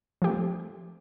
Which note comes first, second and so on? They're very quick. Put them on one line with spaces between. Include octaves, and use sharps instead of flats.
F3 G4 A3 C4